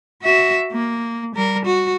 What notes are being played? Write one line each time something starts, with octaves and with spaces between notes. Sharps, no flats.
F#4 E5
A#3
G3 A#4
F#4